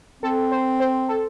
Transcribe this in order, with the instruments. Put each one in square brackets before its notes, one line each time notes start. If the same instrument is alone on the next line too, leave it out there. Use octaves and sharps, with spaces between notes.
[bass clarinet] C4 [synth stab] A4
[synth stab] C5
C5
A4